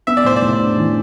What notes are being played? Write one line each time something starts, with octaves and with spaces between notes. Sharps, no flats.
B3 E5
D5
A2 C5
D5
A2
D4
E3